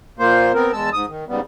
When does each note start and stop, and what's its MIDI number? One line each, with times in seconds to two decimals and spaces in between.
0.19 0.52 46
0.19 0.52 58
0.19 0.52 72
0.54 0.72 59
0.54 0.72 60
0.54 0.72 70
0.73 0.90 40
0.73 0.90 56
0.73 0.90 81
0.73 0.90 88
0.93 1.06 44
0.93 1.06 87
1.09 1.25 51
1.29 1.40 44
1.29 1.40 49
1.29 1.40 55
1.29 1.40 59